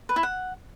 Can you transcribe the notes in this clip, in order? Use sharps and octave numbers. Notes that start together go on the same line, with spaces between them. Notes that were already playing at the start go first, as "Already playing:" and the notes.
B4
E4
F#5